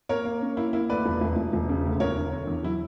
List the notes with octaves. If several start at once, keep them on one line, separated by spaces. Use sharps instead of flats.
A#3 A#4 C#5
A#3
C#4
A#3 E4
A#3 E4
D2 B4 D5
E1
E1
E1
E1
C#3
D2
E1 A#4 C#5
D3
D3
E2
F#3 E4